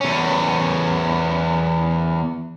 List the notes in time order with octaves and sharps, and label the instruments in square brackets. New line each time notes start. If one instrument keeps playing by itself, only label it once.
[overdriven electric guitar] E2 C#4